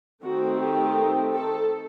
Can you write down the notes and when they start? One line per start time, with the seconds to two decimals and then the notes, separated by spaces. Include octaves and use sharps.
0.24 D#3 A3 C4 F#4
0.60 G4
1.33 A4